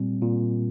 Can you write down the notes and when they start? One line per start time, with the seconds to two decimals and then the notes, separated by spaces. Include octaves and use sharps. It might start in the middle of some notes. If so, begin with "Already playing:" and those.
Already playing: A#2 G3 C4
0.22 A#2